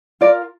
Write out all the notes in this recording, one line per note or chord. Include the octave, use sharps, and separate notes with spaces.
F4 A#4 D5